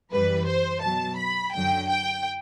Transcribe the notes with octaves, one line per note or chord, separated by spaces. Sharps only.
F#2 E3 G3 B4
C5
B2 F#3 A5
B5
F#2 D3 F#3 G5
G5